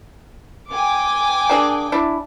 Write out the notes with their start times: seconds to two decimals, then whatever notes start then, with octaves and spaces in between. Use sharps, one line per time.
0.71 G5 G#5 D6
1.49 A#3 D4 G#4
1.92 D4 E4